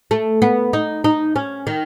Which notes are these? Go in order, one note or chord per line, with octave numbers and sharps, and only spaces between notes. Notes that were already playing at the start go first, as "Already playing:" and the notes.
A3
B3
D#4
D#4
C#4
D#3